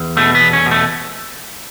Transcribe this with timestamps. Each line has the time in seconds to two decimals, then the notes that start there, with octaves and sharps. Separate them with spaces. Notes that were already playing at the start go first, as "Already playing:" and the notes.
Already playing: E2
0.17 B2 A3
0.35 B3
0.41 E2
0.53 C#4
0.66 B2
0.71 A3